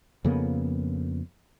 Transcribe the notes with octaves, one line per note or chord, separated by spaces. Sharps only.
F2 C#3 A#3 B3